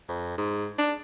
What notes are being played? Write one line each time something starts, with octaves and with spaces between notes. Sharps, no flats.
F2
G#2
D4